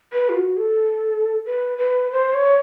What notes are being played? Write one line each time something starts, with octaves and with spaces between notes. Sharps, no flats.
B4
F4
F#4
A4
B4
B4
C5
C#5